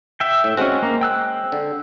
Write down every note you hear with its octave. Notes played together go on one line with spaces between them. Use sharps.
E5 G5
A2
G#3 C4 C#4 F#4
A#3
G5 E6 F#6
D3